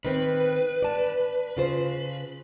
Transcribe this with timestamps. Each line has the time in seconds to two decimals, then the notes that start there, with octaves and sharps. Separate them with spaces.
0.05 D#3 C4 B4
0.82 D5 A5
1.57 C#3 F4 C5